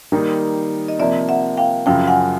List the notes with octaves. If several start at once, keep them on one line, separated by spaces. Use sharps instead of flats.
D#3 G3 A#3 D#4
D#5
C3 F3 A#3 D5 E5
E5 F#5
F5 G5
F#2 C#3 F3 F5 G5
F#5 G#5